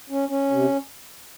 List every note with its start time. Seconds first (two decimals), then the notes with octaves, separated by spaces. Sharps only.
0.09 C#4
0.29 C#4
0.50 C3